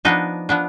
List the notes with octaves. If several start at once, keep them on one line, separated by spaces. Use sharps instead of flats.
F3 B3 D4 D#4
F3 B3 D4